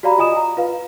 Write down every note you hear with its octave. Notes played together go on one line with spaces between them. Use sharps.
F#4 G4 D5 F5 A#5 B5
F4 D#5 G#5 D#6 E7
A#5
F4 B4 F5